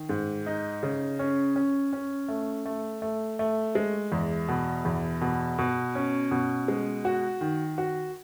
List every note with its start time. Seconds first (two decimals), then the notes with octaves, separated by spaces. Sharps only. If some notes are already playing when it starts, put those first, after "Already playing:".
Already playing: D#3
0.09 G#2
0.46 D#4
0.83 C#3
1.19 C#4
1.56 C#4
1.93 C#4
2.28 A3
2.66 A3
3.02 A3
3.39 A3
3.75 G#3
4.12 E2
4.49 B2
4.85 E2
5.21 B2
5.58 B2
5.95 C#4
6.31 B2
6.68 G#3
7.05 F#4
7.41 D#3
7.78 F#4